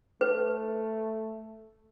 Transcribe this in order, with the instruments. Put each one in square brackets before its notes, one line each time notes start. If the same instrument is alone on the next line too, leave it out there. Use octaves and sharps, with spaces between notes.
[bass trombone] A3 [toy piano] B4